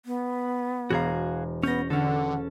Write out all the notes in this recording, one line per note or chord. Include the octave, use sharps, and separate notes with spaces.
B3
E1 F#4 G#4 F5 A#5
B3 C#4 G6 A#6
D3 C#4 A4 F#5